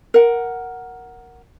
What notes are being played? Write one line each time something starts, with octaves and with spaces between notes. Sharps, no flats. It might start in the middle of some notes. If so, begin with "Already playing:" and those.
A#4 F#5